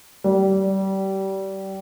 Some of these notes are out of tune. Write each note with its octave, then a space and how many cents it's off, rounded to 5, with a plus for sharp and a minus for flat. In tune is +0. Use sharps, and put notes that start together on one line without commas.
G3 -25